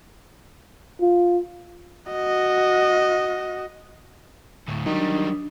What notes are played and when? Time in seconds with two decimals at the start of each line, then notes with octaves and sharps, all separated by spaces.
1.01 F4
2.11 F#4 D#5
4.68 D2 A2
4.86 D#3 F#3 G3 D4 D#6